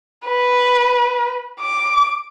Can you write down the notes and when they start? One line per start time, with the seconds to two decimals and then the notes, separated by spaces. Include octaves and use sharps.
0.26 B4
1.60 D6